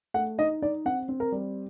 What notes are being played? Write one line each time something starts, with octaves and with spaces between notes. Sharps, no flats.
A3 F#5
D#4 D#5
D#4 D5
C4 F#5
C4
A#4
G3